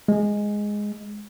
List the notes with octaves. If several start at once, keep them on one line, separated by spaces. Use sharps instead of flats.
G#3